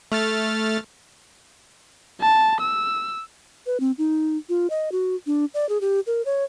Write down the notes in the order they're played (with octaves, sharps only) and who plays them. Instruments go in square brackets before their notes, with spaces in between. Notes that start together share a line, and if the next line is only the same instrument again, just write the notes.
[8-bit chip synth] A3 F6 A6
[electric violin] A5
E6
[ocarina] B4
C4
D#4
F4
D#5
F#4
D4
D5
G#4
G4
A#4
C#5